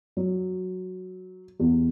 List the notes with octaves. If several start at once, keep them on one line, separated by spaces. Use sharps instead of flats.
F#3
E2